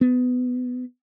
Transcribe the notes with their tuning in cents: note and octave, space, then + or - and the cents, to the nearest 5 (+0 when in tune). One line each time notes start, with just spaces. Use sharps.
B3 +20